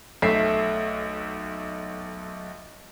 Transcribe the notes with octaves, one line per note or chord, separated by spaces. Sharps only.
B1 A3 E5 B6 C7